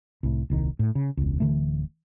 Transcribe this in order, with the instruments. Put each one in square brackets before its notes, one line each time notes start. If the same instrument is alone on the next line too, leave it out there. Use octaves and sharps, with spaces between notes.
[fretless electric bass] C2 A2
D#1 C2 D#3
A2
C#3
E1 C#2
D1 D3 E3 A3